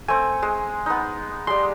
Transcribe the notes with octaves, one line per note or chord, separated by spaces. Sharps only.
A3 C4 G#5
G#3
B3 D#4
G3 G#3 C6